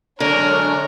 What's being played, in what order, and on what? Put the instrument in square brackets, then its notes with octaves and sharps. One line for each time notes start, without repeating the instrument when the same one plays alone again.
[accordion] F#2 G#3 D4 [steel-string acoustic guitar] D3 [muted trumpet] A#4 [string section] C#5